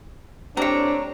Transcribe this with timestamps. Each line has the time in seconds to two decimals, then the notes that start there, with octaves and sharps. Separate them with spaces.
0.57 A2 G3 C4 D4 C#5 A#5